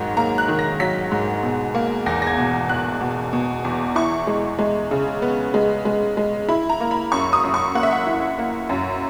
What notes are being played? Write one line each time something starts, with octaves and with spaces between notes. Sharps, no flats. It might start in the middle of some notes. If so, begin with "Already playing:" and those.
Already playing: G#2 D#3 F#3
A#3 A#5
F#6
D#3
A#6
F#3 B6
G#2
B2
A#3
E2 A#6
A#6
G#6
B2
E2 F#6
B2
B2
E2
E4 C#6
G#3
G#3
C#3
B3
G#3
G#3
G#3
E4 B5
A#5
A#3
B5
F#2 C#6
D#6
F#2
C#6
A#3 F#5
E5
F#5
E4
A#3
F#2